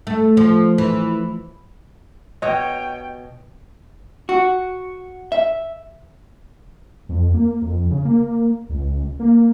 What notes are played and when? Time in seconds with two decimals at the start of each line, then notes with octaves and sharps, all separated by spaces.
0.07 A3
0.37 F3
0.78 E3
2.42 B2 C#5 D#5 G5
4.29 F#4
5.32 E5
7.09 F2
7.34 A#3
7.62 F2
7.91 C#3
8.05 A#3
8.69 C#2
9.20 A#3